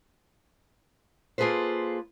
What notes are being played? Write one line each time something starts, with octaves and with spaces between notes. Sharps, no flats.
A#3 F4 G#4 A4 B4 C5